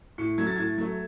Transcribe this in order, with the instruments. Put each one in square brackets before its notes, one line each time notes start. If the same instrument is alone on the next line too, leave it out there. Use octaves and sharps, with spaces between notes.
[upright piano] A2 C#7
F#3 A3 G#6
A6
A2 G#6
F#3 A3